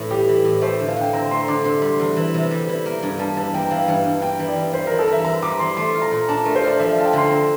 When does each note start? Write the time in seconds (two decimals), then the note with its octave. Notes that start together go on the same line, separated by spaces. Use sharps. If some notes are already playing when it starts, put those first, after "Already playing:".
Already playing: A2 E3
0.10 G3 G4
0.28 E3
0.44 A2
0.61 A3 C5
0.80 D3
0.88 F5
0.96 D3 G5
1.13 C4 A#5
1.30 A3 C6
1.48 D3 D6
1.64 C3 C6
1.82 G3 C6
2.00 E2
2.17 E3
2.34 C3
2.51 G3
2.68 E3
2.86 A#3
3.03 G2
3.19 G3 A5
3.36 E3 A5
3.54 A#3 G5
3.64 G5
3.71 E3 F5
3.88 G2
4.06 G2
4.22 A#3 G5
4.39 E3
4.48 D5
4.56 G2
4.73 G3 C5
4.87 E3 A#4
4.99 A4
5.08 E3
5.13 E5
5.25 C4 A#5
5.42 G3 D6
5.59 E3 C6
5.77 A3 C6
5.94 F4
6.02 A#5
6.11 A#2
6.29 D4 A5
6.44 A3 A#4
6.55 C5
6.63 F4 D5
6.79 F3 E5
6.92 F5
6.97 F4 A5
7.05 G5
7.13 D3 C6
7.31 C4 A#5